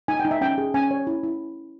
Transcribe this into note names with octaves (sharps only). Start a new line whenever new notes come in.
D#4 G#5
G5
D#4
E5
C#4 G5
G#4
C#4 G#5
C#5
E4
E4